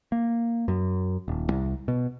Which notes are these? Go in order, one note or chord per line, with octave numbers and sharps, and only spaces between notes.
A#3
F#2
D#1
C2
B2